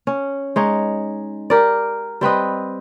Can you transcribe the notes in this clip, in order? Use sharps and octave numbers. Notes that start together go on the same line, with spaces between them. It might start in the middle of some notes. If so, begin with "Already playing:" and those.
C#4
G#3 D#4 C#5
G4 A#4 D5
G3 C4 B4 D#5